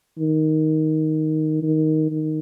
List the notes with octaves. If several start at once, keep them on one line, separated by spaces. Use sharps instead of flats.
D#3
D#3
D#3